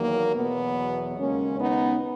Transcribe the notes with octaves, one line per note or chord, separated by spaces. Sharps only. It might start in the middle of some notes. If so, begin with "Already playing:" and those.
Already playing: E2 D#3 F#3 A#3
E2 B2 F#3 B3
D#2 C#3 G#3 A#3 C#4
B3 D#4